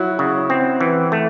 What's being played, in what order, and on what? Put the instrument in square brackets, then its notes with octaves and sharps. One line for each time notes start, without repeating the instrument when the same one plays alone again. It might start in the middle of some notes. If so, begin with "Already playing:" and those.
Already playing: [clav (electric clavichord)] F#3 [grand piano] E4 F#4
[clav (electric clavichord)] C#3
C4
E3
A3